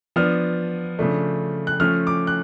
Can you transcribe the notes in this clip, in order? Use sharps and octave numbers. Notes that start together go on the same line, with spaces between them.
F3 B3 D4 F6
C#3 F3 A3 D4
F#6
F3 A3 C#4 F6
D6
F#6